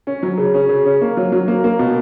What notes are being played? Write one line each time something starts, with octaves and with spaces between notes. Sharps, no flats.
C#4
F#3
C#3
C#4
C#3
C#4
A#3
F#3
F#3
A#3
A#3
B2